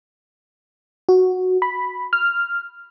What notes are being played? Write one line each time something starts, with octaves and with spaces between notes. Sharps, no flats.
F#4
B5
F6